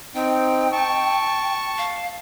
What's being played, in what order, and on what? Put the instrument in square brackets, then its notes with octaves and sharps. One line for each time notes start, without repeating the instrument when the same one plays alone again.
[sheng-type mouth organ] C4 D#4 [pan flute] G5
[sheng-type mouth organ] A5 C#6
[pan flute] F5